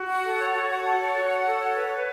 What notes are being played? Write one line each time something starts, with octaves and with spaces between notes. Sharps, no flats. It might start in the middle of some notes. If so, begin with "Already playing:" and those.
Already playing: F#4
F#5
A4
C#5
F#4
F#5
A4
C#5
F#4
F#5
A4
C#5
B4
B4